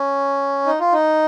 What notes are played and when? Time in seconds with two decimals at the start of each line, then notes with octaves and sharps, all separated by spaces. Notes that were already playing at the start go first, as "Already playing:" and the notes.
Already playing: C#4
0.66 D#4
0.80 F4
0.92 D#4